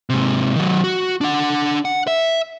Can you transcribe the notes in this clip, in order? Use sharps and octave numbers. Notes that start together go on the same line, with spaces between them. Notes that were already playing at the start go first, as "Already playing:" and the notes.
G#2 C3
D#3 F#3
F#4
D4 F#5
F#5
E5